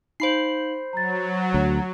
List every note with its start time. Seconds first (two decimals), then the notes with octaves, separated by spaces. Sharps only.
0.20 D#4 C5 F5 B5 C7 F#7
0.93 F#3 A#5 A6
1.54 D2